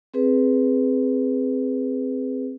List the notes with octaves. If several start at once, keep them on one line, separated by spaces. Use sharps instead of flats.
C4 G#4 B4